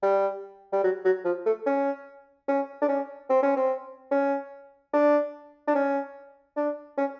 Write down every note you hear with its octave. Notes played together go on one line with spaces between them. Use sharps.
G3
G3
F#3
F#3
F3
A3
C#4
C#4
D4
C#4
C4
C#4
C4
C#4
D4
D4
C#4
D4
C#4